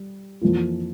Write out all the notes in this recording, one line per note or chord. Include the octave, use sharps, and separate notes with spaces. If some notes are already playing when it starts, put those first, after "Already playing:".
Already playing: G3
F2 E3 A#3 F4